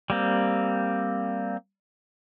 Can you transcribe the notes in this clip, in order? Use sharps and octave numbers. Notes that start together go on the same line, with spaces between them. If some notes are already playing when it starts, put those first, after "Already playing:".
G3 A#3 C4